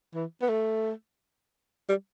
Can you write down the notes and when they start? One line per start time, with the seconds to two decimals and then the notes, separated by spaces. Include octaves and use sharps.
0.14 E3
0.42 B3
0.49 A3
1.89 G3